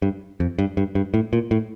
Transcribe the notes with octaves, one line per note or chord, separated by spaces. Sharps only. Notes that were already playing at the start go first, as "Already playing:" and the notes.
G2
F2
G2
G2
G2
A2
A#2
A2